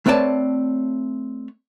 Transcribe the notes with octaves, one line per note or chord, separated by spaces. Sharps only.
A3 C4 B4 C#5 D5 A5